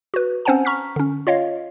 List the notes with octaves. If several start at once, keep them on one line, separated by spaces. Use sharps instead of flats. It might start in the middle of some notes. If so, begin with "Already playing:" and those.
F#4 B4
C4 C#4 C5 F#5 G#5 A5
A#5 C#6 F6 B6
D3 C#4
F4 C#5 D#5 F5